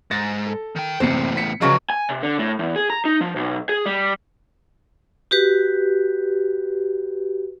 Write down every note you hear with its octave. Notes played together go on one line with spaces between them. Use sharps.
G#2 A6 A#6
A4
D#3 G5
F#1 E2 A2 C3 C5 C#7
B6 C#7
C#3 F3 F#3 G#3 B4
G#5
C3
D3
A2
E2
G#4
A#5
D#4
F3
B1
G#4
G3
F#4 G4 B4